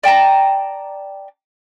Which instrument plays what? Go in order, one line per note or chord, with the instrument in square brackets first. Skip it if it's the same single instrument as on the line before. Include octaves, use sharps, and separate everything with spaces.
[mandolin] D5 G5 A5 A#5